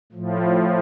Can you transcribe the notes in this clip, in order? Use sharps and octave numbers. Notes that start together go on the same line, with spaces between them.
A2 F3